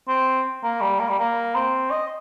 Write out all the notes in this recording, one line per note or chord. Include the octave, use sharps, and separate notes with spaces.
C4
A#3
G3
A#3
G3
A#3
C4
D#5